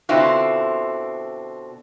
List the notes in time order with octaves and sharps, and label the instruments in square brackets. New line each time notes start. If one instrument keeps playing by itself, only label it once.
[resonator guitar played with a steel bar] B2 D3 C4 E4 F4